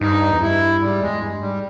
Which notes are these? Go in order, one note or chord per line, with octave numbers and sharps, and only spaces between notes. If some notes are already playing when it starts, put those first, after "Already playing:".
G2 D#4
E2
G2 E4
G#2 G3
E2 G#3
G2
G#2 G3